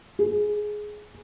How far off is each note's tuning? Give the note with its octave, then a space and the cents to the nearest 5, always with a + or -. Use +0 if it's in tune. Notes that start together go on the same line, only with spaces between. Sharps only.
G#4 +10